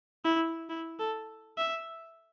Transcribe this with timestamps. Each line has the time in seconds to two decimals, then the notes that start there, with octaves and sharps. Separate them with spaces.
0.24 E4
0.69 E4
0.99 A4
1.58 E5